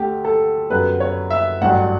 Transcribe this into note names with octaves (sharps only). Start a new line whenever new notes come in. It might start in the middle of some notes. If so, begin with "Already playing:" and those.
Already playing: D2 D3 A3 G4
A4
F#2 D3 G3 B3 B4
C#5
E5
A1 G2 F#3 F#5